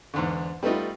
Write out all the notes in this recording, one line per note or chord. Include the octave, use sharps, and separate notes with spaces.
E2 G#2 D3
G3 A3 B3 D#4 F4